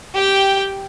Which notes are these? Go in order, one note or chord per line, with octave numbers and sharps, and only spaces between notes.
G4 G5